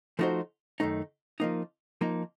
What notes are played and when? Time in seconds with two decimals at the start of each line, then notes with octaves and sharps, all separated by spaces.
0.19 F3 A3 D#4 F#4 C5
0.80 F#2 D#3 A3 D#4
1.40 F3 A#3 D#4
2.01 F3 A#3 D#4